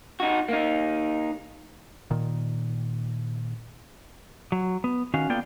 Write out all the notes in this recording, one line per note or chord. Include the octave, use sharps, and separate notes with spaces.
D#4 F#4
A#3 D#4
A#2 D#3
F#3
B3
D#3 C#4 F#4 F5
A#3 B3 F4 A4 D5 G5